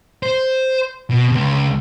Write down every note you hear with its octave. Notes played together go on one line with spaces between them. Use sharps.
C5
B2
C#2